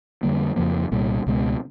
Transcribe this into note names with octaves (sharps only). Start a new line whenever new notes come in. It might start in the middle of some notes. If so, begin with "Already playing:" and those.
F2 D3 G3 A#3
F2 C#3 F3 A#3
C2 A#2 G3
C#2 B2 G#3